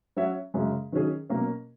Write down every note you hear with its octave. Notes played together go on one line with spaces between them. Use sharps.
F#3 C#4 F#4 C#5 E5
F#2 C#3 G#3 C#4
D#3 F#3 C#4 G#4
B2 F#3 A#3 C#4